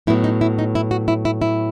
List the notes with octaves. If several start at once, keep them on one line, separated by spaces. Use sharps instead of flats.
A2 F#3 B3 E4
D#4
E4
D#4
E4
F#4
E4
E4
E4